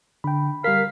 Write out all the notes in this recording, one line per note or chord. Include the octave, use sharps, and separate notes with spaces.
D3 G5 B5
G3 A#4 F5 B6